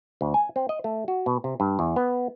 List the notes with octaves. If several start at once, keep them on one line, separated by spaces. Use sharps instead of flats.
D2
G#5
C4
D#5
A3
F#4
B2
C3
G2
E2
B3